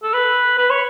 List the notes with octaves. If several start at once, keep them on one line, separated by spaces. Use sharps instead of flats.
A4
B4
B4
C#5